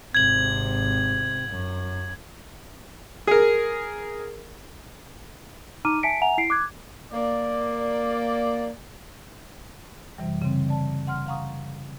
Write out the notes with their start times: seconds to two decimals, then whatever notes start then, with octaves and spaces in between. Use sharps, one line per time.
0.15 G#1 C3 G#6 F#7
1.50 F#2
3.27 G#4 A#4
5.85 D#4 A#5 D6 F6 D#7
6.03 E5 G#5 A5 B6 C#7 D7
6.21 E5 F#5 G#5 A#5 F7
6.38 E4 C7 D7
6.50 D6 F#6 G#6
7.13 A#3 D5
10.18 F#2 C3 E3 G3
10.42 C#3 G3 C4
10.68 D5 A5
11.07 F#5 C6 F6
11.26 F5 F#5 A#5 C#6 D#6